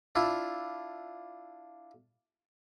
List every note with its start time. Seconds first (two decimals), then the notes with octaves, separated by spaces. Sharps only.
0.15 D4 E4 F4